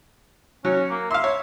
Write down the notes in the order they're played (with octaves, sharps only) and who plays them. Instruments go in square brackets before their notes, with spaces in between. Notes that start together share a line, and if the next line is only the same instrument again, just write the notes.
[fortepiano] F#3 [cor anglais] C#4
[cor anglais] A#3
[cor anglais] E5 [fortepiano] F5 C6
[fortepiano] C#5